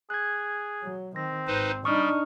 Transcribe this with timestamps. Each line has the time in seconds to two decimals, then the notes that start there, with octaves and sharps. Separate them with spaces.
0.10 G#4 F#6 G#6
0.83 F#3
1.16 D#3 C4 A#6
1.47 G#1 D#4 B4 C5
1.85 G3 D4 D#4 C#6 D#6 F6